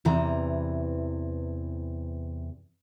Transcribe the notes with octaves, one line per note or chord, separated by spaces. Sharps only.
E2 C3 E3 A#5